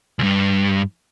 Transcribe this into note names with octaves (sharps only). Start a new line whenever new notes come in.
C#2 G2